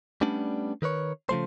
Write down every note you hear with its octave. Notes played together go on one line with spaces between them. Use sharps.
G3 A3 B3 C#4 D4
D#3 A#4 B4 C#5
C#3 F3 A3 C5